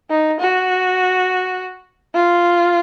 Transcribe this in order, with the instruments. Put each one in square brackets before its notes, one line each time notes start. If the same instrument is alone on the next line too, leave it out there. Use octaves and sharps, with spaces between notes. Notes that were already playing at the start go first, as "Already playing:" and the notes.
[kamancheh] D#4
F#4
F4